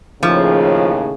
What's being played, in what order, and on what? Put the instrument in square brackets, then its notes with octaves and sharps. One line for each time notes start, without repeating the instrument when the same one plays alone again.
[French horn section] D#2 A2 C#3 [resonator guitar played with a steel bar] F3